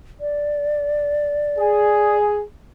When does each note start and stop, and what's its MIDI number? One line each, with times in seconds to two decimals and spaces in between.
0.20 2.17 74
1.57 2.41 68